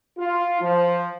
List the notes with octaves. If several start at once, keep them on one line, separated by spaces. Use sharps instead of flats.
F4
F3